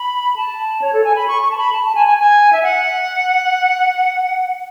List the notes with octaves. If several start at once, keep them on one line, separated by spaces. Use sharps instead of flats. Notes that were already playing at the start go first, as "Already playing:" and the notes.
Already playing: B5
A5
C#5
A4
G#5
B5
C#6
C#6
A5
B5
A5
A5
G#5
G#5
G#5
E5
F#5